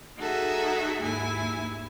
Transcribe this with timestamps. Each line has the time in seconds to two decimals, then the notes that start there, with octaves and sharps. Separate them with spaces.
0.18 D#4 F#4 G#4 A4 E5
1.02 D#2 G#2 E4 G#5